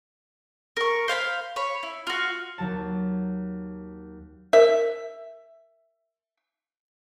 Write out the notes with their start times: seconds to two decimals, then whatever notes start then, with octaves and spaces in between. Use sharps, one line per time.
0.77 A#4 C#6
1.08 C5 F5 G#5 B5
1.56 C#5 B5
1.83 E4
2.07 F4 F#4
2.58 D#2 F#3 A5
4.53 A#4 E5